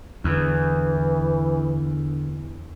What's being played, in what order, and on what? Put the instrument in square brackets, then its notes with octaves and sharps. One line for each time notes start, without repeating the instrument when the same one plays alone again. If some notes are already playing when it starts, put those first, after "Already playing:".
[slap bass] E2 [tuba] D3 [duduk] E3